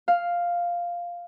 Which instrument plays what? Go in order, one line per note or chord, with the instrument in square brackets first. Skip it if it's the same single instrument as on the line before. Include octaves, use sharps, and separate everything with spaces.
[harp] F5